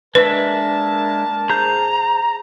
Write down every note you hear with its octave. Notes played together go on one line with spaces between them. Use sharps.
G#3 A#3 D4 A#4 B4 E5 A5
G#4 C5 A#5 G6